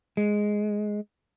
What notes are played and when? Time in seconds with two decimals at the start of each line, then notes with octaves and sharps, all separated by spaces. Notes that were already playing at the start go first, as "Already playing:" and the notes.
0.17 G#3